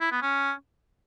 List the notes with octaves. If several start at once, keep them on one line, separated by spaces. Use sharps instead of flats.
E4
B3
C#4